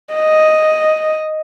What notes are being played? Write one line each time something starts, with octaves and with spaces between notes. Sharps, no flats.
D#5